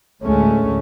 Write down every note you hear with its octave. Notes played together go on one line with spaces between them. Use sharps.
D2 A2 G#3 A3 C#4